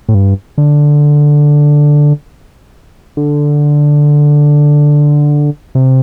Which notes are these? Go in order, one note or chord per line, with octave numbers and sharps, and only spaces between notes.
A2
G2
D3
D3
C3